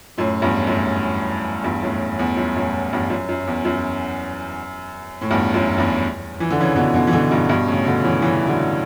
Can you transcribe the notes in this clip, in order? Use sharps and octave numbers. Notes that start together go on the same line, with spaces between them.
F#2 A2
E2 G2
F#2 A2
E2 G2
F#2 A2
E2
F#2
F#2 A2
E2 G2
F#2
F#2
E2
F#2
A2
E2 G2
F#2
E2 G2
E3
D3
C#3 E3
B2 D3
B2 D3
E3
B2 D3
G2 B2
G2 B2
A2 C#3
B2 D3
C#3 E3
C#3 E3
D3 F#3